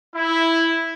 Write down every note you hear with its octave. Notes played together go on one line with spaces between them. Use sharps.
E4